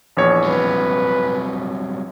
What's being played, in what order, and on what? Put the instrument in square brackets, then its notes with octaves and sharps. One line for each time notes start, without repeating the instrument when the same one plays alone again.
[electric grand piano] A#1 E2 C#5
[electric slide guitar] F#3 G3 C4 [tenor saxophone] B4